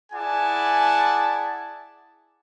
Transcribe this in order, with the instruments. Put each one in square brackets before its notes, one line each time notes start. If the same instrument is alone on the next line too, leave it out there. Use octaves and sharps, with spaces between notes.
[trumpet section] E4 G#4 D5 F#5 G#5 A5